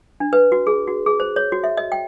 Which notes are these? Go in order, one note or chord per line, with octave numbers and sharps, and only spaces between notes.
D4
B4
F#4
G#4
F#4
G#4
C5
C#5
F#4
E5
D#5
G5